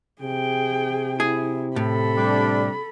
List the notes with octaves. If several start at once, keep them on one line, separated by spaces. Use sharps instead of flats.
C3 G#4 G5
E4 G#4
A2 A4 B5
G3 D4